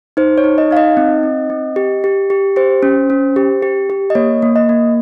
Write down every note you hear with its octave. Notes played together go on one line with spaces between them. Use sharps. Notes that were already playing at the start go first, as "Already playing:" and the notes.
D#4 C5
C#5
D#4
D#5
D#4 F5
D#5
C4
C4
C4
G4
G4
G4
G4 C5
C#4
C#4
G4
G4
G4
D#5
A#3 C#5
A#3
D#5
A#3